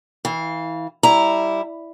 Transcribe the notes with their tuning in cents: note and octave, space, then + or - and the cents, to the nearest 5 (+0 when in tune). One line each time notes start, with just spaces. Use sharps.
E3 -25 F5 +0
G3 +0 E4 +0 A#5 +0